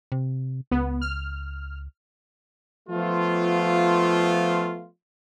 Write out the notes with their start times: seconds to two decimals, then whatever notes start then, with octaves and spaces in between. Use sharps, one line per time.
0.12 C3
0.71 C#2 B3
1.01 F6
2.89 F3 A3 B3 F4